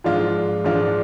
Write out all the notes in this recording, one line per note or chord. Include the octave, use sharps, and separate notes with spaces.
G#2 F3 G#3 D4 F4
G#2 F3 G#3 D4 F4